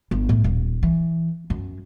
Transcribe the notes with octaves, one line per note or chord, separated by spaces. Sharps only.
G1
A2
D#1
E3
F#2